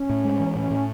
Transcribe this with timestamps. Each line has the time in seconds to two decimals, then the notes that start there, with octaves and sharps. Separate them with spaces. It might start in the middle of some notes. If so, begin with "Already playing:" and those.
Already playing: C#4
0.10 A2
0.24 G#3
0.40 E3
0.55 A2 C#4
0.71 A2